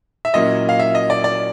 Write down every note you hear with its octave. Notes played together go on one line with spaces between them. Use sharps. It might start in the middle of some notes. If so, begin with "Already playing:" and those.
E5
A#2 F#3 A#3 C#4 E4 D#5
F5
E5
D#5
D5
D5